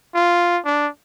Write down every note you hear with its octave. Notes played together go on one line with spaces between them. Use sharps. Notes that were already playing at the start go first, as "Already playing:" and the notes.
F4
D4